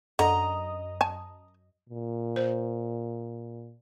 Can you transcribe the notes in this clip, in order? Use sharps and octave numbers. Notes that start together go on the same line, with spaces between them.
F#2 D3 D#5 A#5 D#6
G#5 A5
A#2
C5